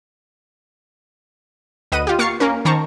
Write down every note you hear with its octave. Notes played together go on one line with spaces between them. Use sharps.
D2 B4 D#5 F#5 D#7
F4 G4
A#3 C#6 F6 A6 C7 C#7
A#3 C#4 A#4
D#3 C5 A5 A#5 C#6